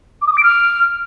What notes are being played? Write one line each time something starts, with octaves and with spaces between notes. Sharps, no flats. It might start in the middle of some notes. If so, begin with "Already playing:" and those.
D6
D#6
D6
D7
F6